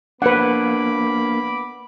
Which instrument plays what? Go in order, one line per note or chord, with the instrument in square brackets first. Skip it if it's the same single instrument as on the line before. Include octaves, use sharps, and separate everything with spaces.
[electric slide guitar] A#3 D4 [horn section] B3 B5 [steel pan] B4 F#5 [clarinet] D6